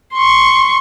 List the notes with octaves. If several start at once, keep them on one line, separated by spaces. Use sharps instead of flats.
C6 C#6